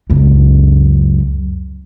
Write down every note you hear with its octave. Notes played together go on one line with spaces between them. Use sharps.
C#2 F#2